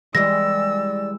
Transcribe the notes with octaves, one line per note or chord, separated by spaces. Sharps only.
E3 G3 G#3 D5 E6 A#6